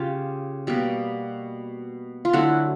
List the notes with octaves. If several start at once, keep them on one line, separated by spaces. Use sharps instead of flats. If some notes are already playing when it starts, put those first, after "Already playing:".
Already playing: C#3 F4 G4
B2 G3 A#3
F4
D3 F#3 A3 E4 F#4